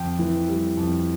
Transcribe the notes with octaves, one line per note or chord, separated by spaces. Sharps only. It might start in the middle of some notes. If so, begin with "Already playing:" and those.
Already playing: F2 G5
E3
G3
F2